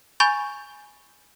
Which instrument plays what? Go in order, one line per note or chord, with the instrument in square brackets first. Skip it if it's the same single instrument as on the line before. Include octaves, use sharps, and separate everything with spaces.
[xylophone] G#5 B5 C#6 G6 A6